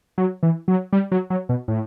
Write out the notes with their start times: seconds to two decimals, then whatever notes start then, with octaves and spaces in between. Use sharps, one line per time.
0.18 F#3
0.43 E3
0.68 F#3
0.93 G3
1.12 F#3
1.30 F#3
1.49 B2
1.68 A2